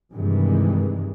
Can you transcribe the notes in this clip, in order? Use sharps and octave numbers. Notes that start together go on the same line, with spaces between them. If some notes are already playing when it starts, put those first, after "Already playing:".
G2 C3 D#3 E3 G#3